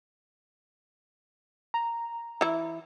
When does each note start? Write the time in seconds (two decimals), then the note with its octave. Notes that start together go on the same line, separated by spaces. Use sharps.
1.74 A#5
2.41 E3 E4